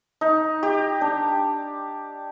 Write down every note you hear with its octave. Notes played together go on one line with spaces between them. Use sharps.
D#4
G4
D4